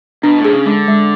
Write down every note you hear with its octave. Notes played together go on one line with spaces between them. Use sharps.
B2 D4
A2
B2 G#4
C#3
D3 G#3
G#3